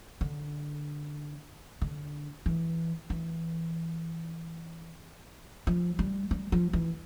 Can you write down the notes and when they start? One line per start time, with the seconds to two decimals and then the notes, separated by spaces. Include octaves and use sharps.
0.21 D3
1.82 D3
2.46 E3
3.10 E3
5.67 F3
5.99 G3
6.31 G3
6.52 F3
6.73 E3